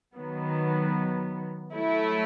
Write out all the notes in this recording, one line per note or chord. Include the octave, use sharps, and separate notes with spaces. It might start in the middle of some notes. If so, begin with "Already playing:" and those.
D#3 F#3 B3
F#3 A3 E4